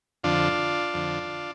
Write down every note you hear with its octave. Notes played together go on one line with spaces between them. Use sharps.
F2 D3 D4 F4
F2 D3